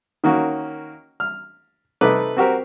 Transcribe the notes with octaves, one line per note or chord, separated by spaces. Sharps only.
D#3 A#3 C#4 F#4
F6
C3 A3 D#4 B4 D6
C4 F#4 G4 A#4 C5